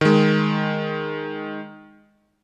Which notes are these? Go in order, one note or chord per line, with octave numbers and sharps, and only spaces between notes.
D#3 G#3